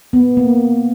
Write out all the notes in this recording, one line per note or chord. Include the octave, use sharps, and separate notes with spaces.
B3
A#3